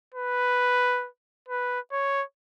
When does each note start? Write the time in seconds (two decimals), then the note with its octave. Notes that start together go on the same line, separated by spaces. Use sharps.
0.14 B4
1.49 B4
1.92 C#5